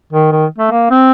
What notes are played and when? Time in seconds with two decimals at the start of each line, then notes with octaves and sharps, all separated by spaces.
0.13 D#3
0.32 D#3
0.58 A3
0.71 A#3
0.91 C4